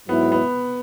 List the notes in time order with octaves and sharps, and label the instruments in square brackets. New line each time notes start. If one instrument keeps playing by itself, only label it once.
[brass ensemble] G#2 F#3 E4 [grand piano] B3
[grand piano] B3